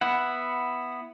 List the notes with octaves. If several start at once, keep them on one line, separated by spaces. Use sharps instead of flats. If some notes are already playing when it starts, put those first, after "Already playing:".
B3 E4 F#5